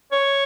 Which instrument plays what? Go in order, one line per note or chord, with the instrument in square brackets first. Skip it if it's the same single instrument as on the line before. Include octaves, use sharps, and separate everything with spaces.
[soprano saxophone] C#5